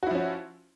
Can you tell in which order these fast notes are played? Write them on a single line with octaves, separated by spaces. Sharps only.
F#4 E4 F3 C#4